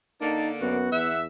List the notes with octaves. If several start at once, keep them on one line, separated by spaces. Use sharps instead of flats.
D3 A#3 D#4 A5
F#2 B3 F#4
E2 E5 F#5